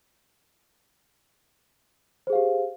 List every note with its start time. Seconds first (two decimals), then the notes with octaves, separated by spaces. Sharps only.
2.27 C5
2.30 G#4
2.33 F5
2.35 G4